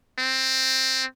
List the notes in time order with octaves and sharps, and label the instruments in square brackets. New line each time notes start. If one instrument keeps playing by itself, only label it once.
[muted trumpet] C4